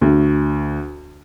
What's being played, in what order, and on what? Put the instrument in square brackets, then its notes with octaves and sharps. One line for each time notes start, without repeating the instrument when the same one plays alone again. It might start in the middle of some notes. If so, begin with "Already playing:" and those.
[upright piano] D2